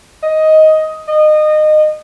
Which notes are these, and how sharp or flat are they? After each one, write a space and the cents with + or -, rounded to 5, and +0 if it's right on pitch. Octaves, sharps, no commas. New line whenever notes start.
D#5 +10
D#5 -25